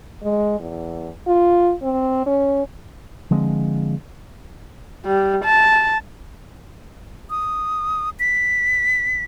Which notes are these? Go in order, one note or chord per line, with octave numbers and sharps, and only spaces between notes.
G#3
E2
F4
C4
C#4
D3 F3 G#3 C4
G3
A5
D#6
B6